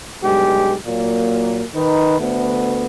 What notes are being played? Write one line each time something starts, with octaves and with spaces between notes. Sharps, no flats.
B1 G2 G#3 G4
A#2 F#3 A#3
D#3 D#4 B4
D2 A3 B3